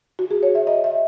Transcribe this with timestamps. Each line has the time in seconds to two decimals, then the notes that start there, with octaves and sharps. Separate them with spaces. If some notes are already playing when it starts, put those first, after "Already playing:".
0.19 F#4
0.31 G#4
0.43 C#5
0.55 E5
0.67 D#5
0.84 E5